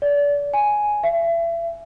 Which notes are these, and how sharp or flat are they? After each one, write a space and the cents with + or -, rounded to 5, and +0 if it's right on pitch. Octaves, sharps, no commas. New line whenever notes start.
D5 -30
G#5 +5
E5 +35